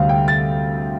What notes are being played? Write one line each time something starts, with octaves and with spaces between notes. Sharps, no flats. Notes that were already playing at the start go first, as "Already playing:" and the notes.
Already playing: D2 C3 G3 C4 F5
G5
A6